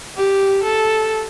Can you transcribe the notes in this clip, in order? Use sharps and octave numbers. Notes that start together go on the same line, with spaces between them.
G4
A4